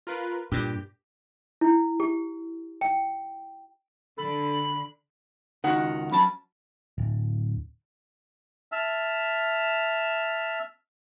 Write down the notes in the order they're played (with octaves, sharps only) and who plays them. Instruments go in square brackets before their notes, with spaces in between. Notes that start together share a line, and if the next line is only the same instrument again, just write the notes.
[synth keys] F4 A#4 B4
[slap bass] G2 A#2 [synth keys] G4
[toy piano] E4
G4
G5
[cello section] D3 [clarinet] A4 [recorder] B5
[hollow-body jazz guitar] C#2 F#4 [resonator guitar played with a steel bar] D#3 F#5
[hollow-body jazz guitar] F#3 C#4 A5 [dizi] B5
[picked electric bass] D1
[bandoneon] E5 A5 E6 F6